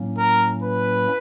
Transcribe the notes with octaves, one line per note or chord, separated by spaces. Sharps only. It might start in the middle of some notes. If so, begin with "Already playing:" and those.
Already playing: A2 F#3 A#3 C#4
A#4
B4